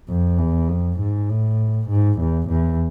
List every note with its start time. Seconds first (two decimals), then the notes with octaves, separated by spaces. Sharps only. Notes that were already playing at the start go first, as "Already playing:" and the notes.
0.09 F2
0.38 E2
0.69 F2
0.99 G#2
1.29 A2
1.89 G#2
2.20 E2
2.49 E2